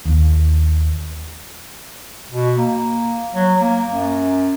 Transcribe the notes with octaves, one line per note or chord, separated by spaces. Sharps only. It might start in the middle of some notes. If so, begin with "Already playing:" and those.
D#2
B2
A#3
F#3
A#3
F#2